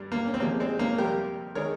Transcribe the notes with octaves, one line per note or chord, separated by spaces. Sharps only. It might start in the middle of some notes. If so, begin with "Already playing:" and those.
Already playing: G2 G3
A#3
C#4
C4
C3 F3 G#3 A#3
G#3 C4
A#3 C#4
F2 C3 G3 G4 A#4
D#3 G#3 A#4 C#5